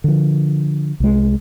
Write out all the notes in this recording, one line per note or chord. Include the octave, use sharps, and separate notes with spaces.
D3 F3
C2 G#3